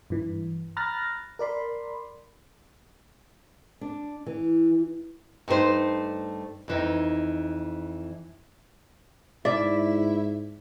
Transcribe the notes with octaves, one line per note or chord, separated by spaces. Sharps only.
G2 E3
A#5 B5 F6 F#6 A6 A#6
A#4 D5 B5 C6
D4
E3
G2 A3 D#4 A4 C5
F2 E3 D#4
G#2 E4 D5 E5